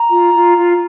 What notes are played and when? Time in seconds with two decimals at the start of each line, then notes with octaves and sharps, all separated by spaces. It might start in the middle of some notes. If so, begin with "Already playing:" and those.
Already playing: A#5
0.09 F4
0.33 F4
0.56 F4